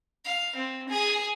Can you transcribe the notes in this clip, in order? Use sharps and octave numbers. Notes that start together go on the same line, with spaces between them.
F5
C4
G#4